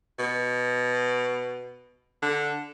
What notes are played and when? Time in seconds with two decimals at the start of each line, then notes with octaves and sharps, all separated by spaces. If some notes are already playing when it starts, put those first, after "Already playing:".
0.19 B2
2.22 D3